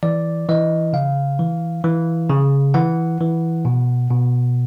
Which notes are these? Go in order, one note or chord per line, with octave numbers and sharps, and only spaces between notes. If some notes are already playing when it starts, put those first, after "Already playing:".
E3 D5
E3 D#5
C#3 F5
E3
E3
C#3
E3 F#5
E3
B2
B2